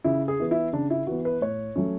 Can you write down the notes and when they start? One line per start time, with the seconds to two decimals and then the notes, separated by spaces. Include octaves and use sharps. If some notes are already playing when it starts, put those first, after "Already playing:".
0.04 C#3 E4
0.28 G#4
0.40 E3 B3
0.51 E4
0.73 C#3 D4
0.90 E4
1.07 E3 B3 F#4
1.25 B4
1.41 A2 C#5
1.76 F#3 A3 C#4